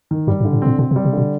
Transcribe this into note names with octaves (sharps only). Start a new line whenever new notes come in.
D#3
G2 G3
G#2
D3
A2
A#2 C4
B2 C4
C3
G3
C3
B2 D3